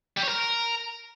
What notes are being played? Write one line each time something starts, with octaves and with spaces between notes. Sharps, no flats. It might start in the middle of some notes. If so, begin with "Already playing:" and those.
G3
C#5
A#4